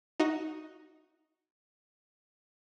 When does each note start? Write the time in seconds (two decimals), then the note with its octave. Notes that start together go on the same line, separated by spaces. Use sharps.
0.20 D#4 F#4 D#5